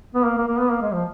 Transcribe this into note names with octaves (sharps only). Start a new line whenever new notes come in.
B3
A#3
A#3
A#3
B3
A#3
G#3
F3